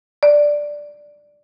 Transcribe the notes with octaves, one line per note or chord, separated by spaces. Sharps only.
D5